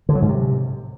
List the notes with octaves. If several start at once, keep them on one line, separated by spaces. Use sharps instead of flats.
D3
F#3
G#2
C3